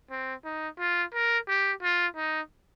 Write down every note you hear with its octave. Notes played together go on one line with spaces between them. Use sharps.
C4
D#4
F4
A#4
G4
F4
D#4